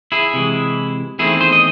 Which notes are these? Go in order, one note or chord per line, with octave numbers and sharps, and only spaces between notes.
E4 G#4
C3 E3 G#3
E2 D#3 A3 C4 E4 G#4
G#4 C5
D#5